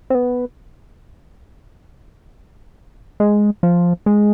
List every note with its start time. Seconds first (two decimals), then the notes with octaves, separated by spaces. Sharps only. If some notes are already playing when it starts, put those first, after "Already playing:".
0.10 C4
0.15 B3
3.20 G#3
3.63 F3
4.06 G#3